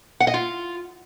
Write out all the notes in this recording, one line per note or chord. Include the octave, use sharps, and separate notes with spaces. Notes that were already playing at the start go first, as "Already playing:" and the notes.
F#5
D#5
F4